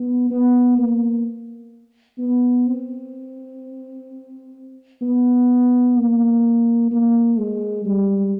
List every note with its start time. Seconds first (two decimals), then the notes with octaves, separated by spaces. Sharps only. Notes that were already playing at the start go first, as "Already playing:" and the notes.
Already playing: B3
0.30 B3
0.77 A#3
2.18 B3
2.67 C4
5.02 B3
5.97 A#3
6.91 A#3
7.38 G#3
7.85 G3